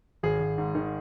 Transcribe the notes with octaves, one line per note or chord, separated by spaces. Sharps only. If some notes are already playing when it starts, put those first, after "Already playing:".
G#1 G#4
G#1
G#2
D#3